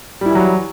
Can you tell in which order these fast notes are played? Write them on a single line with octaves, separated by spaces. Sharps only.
G3 E4 E3 F#3